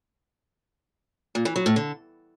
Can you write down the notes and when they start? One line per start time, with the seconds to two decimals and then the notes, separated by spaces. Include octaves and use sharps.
1.35 A#2
1.45 E3
1.56 F#3
1.66 A2
1.76 D3